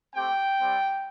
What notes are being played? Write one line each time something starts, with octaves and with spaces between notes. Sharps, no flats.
A3 C4 G4 G5
G3 C4 G4